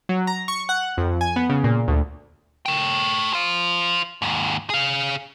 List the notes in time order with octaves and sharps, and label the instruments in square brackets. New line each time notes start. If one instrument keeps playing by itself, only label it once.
[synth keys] F#3
A#5
C#6
F#5
F2
G#5
B3
C#3
A#2
D2
[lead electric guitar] A3 G5
C5 F5
D#2 G#2
G#4 F5